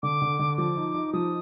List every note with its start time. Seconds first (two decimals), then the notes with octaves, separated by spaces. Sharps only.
0.03 D3 D6
0.22 D3
0.39 D3
0.58 F3 D6
0.77 D#4
0.94 D#4
1.13 F3 D#6